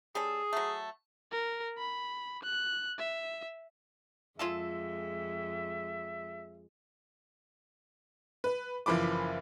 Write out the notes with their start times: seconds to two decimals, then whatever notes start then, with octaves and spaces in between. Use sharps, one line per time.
0.15 G3 C#4 G#4 A4
0.53 F#3 A3
1.31 A#4
1.78 B5
2.43 F#6
2.99 E5
4.39 F2 G#3 F4 G#4 A4 E5
8.44 B4
8.86 F#1 E3 F3 B5 D6